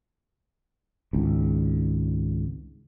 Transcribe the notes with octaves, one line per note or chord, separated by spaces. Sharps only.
G#1 C#2